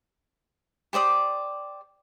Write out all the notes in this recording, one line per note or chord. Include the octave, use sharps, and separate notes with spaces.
G4 C5 D5 D#6